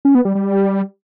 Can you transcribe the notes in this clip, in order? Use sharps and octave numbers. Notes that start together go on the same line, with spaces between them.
C#4
B3
G3
G3